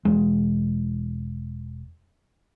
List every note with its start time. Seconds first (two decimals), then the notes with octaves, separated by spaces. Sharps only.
0.05 E1 G#3